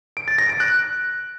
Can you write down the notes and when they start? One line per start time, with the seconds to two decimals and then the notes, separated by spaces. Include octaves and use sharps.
0.17 D7
0.28 A6
0.38 A#6
0.49 D7
0.60 F#6